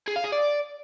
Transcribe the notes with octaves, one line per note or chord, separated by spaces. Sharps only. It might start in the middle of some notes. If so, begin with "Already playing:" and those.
G#4
F5
G#4
D5